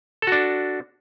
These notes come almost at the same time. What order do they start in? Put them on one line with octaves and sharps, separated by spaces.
A4 F#4 D4